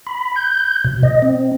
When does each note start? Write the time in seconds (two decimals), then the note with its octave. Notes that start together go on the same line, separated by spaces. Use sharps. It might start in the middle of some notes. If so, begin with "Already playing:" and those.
0.07 B5
0.36 G6
0.85 B2
1.03 D#5
1.22 C4